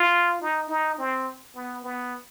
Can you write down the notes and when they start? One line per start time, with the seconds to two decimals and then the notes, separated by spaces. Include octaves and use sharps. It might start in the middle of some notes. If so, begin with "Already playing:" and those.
Already playing: F4
0.41 D#4
0.69 D#4
0.98 C4
1.55 B3
1.84 B3